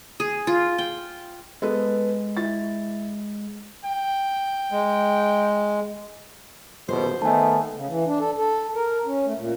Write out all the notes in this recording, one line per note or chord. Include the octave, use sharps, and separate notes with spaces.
G#4
F4
G5
G#3 B3 A4 B4
E4 A6
G5
G#3
D#1 B1 E2 B2 C5
D#3 A3 B3 G#5 A5
C#3
E3
D4
A4
A4
A#4
C#4
A3
A#2